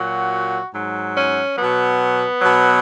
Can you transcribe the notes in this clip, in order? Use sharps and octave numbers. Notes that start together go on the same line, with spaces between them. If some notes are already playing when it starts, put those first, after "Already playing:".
Already playing: A#2 F#3 F#4
G#2 F#3
C#4
B2 F#3 B3
B2 F#3